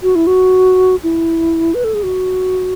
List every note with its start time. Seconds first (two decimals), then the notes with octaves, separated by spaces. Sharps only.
0.03 F#4
0.15 E4
0.27 F#4
1.03 E4
1.75 B4
1.84 A4
1.94 G#4
2.03 F#4